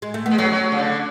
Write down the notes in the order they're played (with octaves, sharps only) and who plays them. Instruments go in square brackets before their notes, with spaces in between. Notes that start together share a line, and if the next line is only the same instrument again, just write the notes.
[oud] G#3
A3
B3
[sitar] G#3
[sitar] F#3 [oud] A3 C#4
[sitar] F#3
C#3
D3